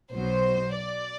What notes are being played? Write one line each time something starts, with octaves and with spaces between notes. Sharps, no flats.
B1 B2 F#3 C5
D5